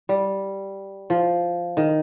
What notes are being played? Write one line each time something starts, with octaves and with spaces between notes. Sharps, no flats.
G3
F3
D#3